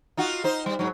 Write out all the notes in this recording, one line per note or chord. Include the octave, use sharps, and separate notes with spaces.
D#4 F4 F#4
D#4 C5
G3
G#2 F#3